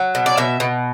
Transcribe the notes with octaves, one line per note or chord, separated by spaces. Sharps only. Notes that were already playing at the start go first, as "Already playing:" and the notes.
Already playing: F#3
B2
D5
B2 E5
B2